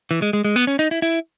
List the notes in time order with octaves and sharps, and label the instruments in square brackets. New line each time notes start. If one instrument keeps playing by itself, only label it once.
[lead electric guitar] E3
G#3
G#3
G#3
B3
C#4
D#4
E4
E4